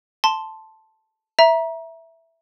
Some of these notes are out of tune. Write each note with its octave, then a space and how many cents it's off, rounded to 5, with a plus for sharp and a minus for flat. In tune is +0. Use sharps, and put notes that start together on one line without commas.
A5 +0 C6 +0
E5 +0 A#5 +25